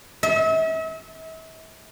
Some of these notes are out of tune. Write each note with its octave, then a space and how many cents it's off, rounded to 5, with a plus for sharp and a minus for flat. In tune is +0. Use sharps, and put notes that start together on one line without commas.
E5 -40